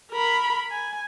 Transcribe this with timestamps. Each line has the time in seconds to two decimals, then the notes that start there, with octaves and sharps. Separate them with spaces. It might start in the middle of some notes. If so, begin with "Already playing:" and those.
0.11 A#4 B5
0.71 G#5